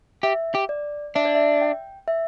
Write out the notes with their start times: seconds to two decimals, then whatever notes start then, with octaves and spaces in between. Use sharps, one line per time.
0.23 G4 E5
0.55 G4
0.69 D5
1.15 D4 E5
1.25 D5
1.35 E5
1.62 G5
2.08 E5